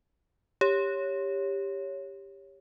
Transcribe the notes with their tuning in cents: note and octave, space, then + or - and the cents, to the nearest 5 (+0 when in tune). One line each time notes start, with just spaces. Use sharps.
G4 +15 C#5 +0